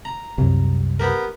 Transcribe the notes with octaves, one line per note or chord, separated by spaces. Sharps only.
A#5
C2 F#2
B3 G4 A#4